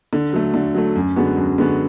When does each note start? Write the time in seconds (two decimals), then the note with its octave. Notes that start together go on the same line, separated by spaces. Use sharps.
0.13 D3
0.33 F#3 A3
0.54 D3
0.75 F#3 A3
0.96 F#2
1.16 D3 G#3 B3 F#4
1.37 F#2
1.58 D3 G#3 B3 F#4